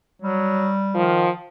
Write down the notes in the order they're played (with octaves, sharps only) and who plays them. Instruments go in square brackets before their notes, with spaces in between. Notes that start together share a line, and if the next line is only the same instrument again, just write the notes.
[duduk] F#3 [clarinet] G3
[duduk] D#3 [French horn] F3